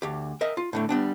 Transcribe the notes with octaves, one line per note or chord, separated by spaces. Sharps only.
D2 G4
A#4 D#5 E5
F4
A2 D3 A3
G3 B3 D4